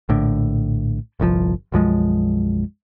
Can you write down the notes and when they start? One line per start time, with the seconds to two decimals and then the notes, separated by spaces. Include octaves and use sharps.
0.09 A#1 A2 D3
1.20 G1 C2 C3 F3
1.72 B1 F#2 F3 G#3